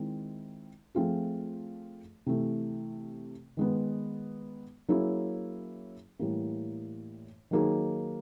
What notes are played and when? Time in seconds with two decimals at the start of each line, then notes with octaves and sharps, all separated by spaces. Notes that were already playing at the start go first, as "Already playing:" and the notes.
Already playing: D#3 G#3 C4 E4
0.95 F3 A3 C4 F4 G#4
2.26 C3 E3 A3
3.57 D#3 G#3 B3
4.89 F#3 A#3 C#4 E4 G#4
6.19 A2 E3 G3 A#3
7.51 D#3 F#3 A#3 D#4 G#4